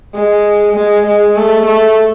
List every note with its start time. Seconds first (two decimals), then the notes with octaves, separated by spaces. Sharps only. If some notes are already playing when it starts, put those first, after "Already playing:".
0.15 G#3
0.76 G#3
1.06 G#3
1.36 A3
1.66 A3